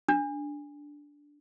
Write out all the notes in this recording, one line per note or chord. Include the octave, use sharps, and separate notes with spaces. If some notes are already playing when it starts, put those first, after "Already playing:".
D4